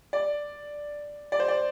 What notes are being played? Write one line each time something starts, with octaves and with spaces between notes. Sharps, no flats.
D5
D5
C5
D5